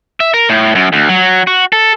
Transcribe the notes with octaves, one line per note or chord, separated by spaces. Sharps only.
E5
A#4
A2
F#2
D2
F#3
F#4
A4